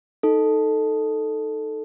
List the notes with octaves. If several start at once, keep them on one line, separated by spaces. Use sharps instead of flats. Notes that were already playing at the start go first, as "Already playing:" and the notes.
D#4 A4